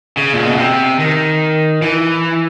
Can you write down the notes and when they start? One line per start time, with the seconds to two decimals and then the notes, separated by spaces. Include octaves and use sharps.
0.17 C#3
0.33 A#2
0.46 B2
0.59 C3
0.99 D#3
1.82 E3